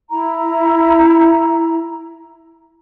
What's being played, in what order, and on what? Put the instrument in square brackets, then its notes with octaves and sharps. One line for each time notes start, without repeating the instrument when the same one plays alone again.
[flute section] E4 A#5